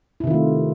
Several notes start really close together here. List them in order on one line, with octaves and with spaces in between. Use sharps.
E4 C3 D#3 F4 A3